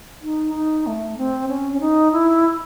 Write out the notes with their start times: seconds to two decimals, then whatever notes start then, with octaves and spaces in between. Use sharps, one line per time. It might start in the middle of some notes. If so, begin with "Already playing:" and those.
0.22 D#4
0.54 D#4
0.86 A3
1.17 C4
1.48 C#4
1.73 C#4
1.80 D#4
2.12 E4